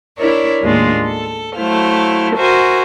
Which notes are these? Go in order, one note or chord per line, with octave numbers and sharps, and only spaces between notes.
D4 E4 A#4 C#5 D5
D#2 A2 G#3 D4 F4
A4
F#3 A3 E4 C5 F5
F#4 A#4 C5 E5 G#5